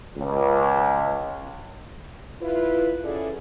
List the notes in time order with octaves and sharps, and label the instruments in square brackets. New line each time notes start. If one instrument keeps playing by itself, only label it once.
[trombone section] C#2
[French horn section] E4 F4 B4
C#4 E4 F#4 G#4 A4 D5